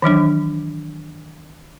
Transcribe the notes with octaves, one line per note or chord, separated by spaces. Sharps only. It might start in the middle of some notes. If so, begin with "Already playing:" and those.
D#3 E3 F#3 D4